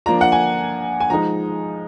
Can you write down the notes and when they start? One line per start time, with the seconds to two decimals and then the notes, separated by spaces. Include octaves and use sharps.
0.06 F3 A#3 D4 F4 A#5
0.21 F#5
0.32 G#5
1.00 G#5
1.10 F3 G#3 D#4 A#5